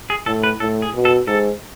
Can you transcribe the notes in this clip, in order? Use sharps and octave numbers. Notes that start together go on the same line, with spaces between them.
G#4
A2 A4
B4
A2 A4
G#4
B2
A4
G#2 A4